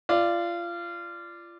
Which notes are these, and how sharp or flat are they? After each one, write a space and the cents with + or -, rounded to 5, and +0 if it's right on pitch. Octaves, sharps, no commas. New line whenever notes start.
F4 -25 D5 +0